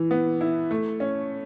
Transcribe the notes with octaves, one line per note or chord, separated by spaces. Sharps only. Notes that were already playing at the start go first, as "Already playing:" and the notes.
Already playing: E3
B3
E4
A3
C#4